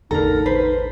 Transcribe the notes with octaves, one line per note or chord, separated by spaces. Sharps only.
A1 E2 D3 D#4 A4 A#4 A#5
B4 C5